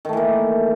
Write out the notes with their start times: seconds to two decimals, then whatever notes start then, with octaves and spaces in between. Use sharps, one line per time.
0.05 D#3
0.09 A3
0.13 E3
0.17 A#3